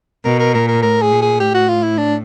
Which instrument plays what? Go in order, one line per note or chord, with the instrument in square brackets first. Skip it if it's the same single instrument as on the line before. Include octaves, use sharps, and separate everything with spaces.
[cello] B2 [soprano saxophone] A#4
[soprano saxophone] A#4
[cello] A#2 [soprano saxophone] A#4
[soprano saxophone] A#4
[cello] A2 [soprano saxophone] A#4
[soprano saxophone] G#4
[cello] A#2
[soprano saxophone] G#4
[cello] A2 [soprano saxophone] G4
[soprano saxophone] F#4
F4
E4
D4